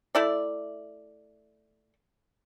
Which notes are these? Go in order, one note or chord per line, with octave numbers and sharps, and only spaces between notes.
A3 E4 D5